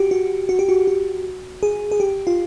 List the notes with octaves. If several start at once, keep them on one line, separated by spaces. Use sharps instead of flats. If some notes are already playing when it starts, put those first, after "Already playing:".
Already playing: F#4 G4
F#4
F#4
G4
F#4
F#4
G#4
G#4
G4
F4